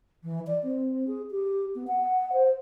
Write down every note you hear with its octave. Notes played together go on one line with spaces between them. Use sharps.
E3
D5
C4
G#4
G4
B3
F#5
C5